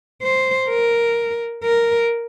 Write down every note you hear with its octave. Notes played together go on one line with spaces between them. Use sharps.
C5
A#4
A#4